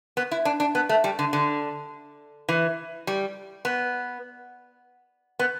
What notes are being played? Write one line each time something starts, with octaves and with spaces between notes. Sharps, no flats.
B3
E4
D4
D4
B3
A3
G3
D3
D3
E3
G3
B3
B3